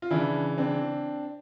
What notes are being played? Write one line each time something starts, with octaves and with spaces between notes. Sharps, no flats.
F4
C#3 E3 D4 E4
C4 D4